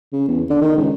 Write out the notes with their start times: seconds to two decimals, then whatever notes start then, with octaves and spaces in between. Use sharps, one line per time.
0.13 C#3
0.28 E2
0.50 D3
0.62 D#3
0.77 C#2